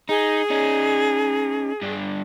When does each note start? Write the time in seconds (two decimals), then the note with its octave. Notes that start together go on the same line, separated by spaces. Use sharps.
0.09 D#4 G#4
0.50 C#4 D#4
1.82 G2 D3